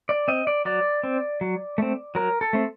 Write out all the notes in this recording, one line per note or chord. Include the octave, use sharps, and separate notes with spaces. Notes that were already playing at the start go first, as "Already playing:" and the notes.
D5
C4 D#5
D5
F#3 D5
C4
F#3
A3 C4
F#3 A#4
A4
A3 C4